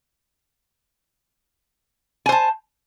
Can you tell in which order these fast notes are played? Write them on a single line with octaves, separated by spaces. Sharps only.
G#5 C5 A5